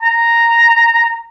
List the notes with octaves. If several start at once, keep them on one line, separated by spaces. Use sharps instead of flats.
A#5